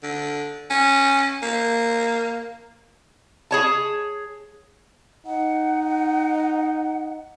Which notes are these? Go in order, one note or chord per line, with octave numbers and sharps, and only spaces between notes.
D3
C#4
A#3
G#4 C#5 A5
D#4 F#5